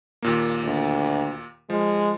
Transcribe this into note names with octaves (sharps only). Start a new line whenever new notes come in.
D#2 A#2 A#3
D2
F3 G#3